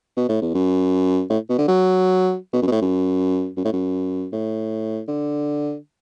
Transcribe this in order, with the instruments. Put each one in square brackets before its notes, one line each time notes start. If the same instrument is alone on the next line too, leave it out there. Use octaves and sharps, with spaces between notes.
[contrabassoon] B2
A2
E2
F#2
A2
B2
D3
F#3
B2
F#2
B2
A2
F#2
F#2
A2
F#2
A2
D3